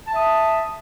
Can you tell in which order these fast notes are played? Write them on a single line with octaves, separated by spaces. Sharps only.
A5 E5 D#6